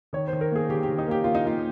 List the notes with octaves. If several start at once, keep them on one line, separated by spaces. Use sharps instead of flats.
D#3 C#5
C5
D#3
A#4
A#3 G#4
D#3 G4
G4
D#3
D#4
A#3 G4
A#3 F4
D#4
A#3 F4